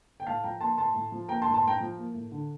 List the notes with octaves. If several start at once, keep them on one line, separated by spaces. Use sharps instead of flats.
G5
A2 F5 A5
F3 G5 A#5
A#3 A5 C6
A2 A5 C6
A2
F3
A#3 G5 A#5
A5 C6
A2
A5 C6
A2 G5 A#5
F3
A#3
A2
D3